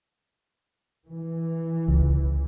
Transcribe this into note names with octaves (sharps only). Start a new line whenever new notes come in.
E3
C#2